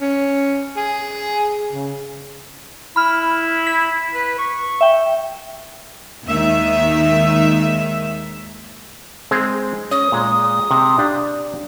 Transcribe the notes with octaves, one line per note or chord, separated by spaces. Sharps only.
C#4
G#4
C#3
E4 B5 F6
B6
B4
C#6
E5 G5
D#2 D#3 G#3 E5
G#3 C4 G#4
C#4 D#6
A#2 G#3
C3
D4 G4 F5